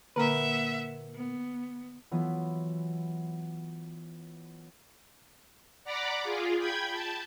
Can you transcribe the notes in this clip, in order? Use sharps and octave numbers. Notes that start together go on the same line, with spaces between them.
A#2 D3 A#3 A#4 B4 E5 F#5 A#5
B3
E3 F#3 B3 F4
D5 F#5 A#5 B5 D6
F4 G#4
G5 B5 G6 G#6
A5